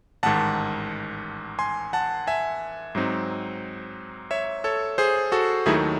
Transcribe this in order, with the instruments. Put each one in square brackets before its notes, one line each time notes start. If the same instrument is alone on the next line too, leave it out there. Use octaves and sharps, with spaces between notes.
[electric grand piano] A1 G#2 D#3 F#5 A5
G#5 C6
F#5 A5
E5 G#5
G#2 F#3 C4 D#4
C#5 E5
A4 C#5
G#4 C5
F#4 A4
D#2 D#3 F#3 A3 D#4 E4 G#4